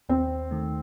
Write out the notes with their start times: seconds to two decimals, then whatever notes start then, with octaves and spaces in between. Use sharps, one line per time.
0.09 D#2 C4
0.51 D#3 A3